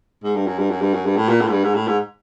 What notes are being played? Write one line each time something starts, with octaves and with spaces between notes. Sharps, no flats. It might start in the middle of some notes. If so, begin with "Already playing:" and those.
G#2
G2
F#2
G2
F#2
G2
F#2
G2
A2
A#2
A2
G#2
G2
G#2
A2
G#2